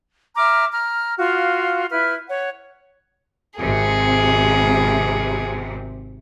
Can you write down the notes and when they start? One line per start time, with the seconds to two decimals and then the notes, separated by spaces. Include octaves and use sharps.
0.36 E5 A#5 D6 F6
0.73 A#5 F6
1.17 F4 F#4 F5
1.90 E4 B4 F6
2.29 C#5 F#5
3.60 G#1 C3 G#4